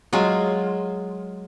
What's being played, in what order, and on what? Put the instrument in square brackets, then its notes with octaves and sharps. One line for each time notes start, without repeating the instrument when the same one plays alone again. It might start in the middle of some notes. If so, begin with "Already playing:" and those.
[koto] F#3 G#3 F4